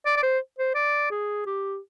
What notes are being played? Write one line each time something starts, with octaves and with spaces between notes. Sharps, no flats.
D5
D5
C5
C5
D5
G#4
G4